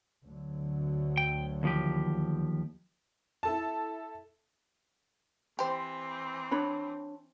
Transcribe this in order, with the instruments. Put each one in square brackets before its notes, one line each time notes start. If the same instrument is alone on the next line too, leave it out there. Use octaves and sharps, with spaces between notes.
[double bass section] D2 D3 F#3
[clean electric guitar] G5
D#2 F3 G4
[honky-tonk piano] E4 A4 A5
[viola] E3 C4 [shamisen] G4 C5
[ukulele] D4 C#5 B5